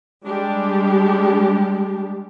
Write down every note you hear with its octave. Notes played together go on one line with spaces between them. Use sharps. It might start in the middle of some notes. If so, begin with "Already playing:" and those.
G3 G#3 D4 G4